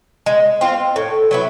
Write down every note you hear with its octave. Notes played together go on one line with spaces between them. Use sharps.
G#3
C4 F4
A2
F#3 B3 E4